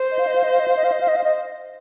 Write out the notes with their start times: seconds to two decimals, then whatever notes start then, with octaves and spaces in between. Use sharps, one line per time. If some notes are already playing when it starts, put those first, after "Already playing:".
Already playing: C5
0.11 D#5
0.19 F5
0.27 D#5
0.35 F5
0.44 D#5
0.52 F5
0.59 D#5
0.68 F5
0.76 D#5
0.84 F5
0.92 D#5
1.01 F5
1.08 D#5
1.16 F5
1.24 D#5